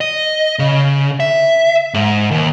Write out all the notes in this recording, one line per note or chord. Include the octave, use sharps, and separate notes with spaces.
D#5
C#3
E5
G#2
D#2